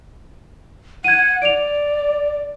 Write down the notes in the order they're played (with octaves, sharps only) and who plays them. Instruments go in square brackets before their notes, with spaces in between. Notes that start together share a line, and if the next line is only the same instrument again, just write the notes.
[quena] F#5 [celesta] G#6 D#7
[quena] D5 [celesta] D7 F7